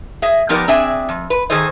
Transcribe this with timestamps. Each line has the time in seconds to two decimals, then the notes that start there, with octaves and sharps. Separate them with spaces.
0.22 G#4 D#5 E5
0.49 F3 B3 D#4 G4 A#4 D5
0.68 C4 D4 G#4 E5 G#5
1.09 F2
1.30 B4
1.50 D#3 F#3 G#4 A4 C5 D#5